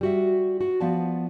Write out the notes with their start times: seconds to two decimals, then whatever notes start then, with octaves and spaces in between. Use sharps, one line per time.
0.01 G3 F#4 E5
0.61 F#4
0.80 F3 B3 D5 A5